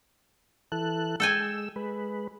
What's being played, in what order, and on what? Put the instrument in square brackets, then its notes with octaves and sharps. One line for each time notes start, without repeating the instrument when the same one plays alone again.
[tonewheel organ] E3 A4 F#6
[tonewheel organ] G#3 E6 [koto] A4 G5 G#5
[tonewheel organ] G#3 B4